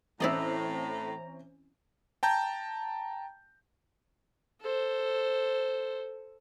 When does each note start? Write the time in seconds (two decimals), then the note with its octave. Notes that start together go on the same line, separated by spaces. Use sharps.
0.20 A2 E3 C4 C#4 E4 D5 D#5 A#5
2.23 G5 A5 A#5 G6
4.61 A4 C5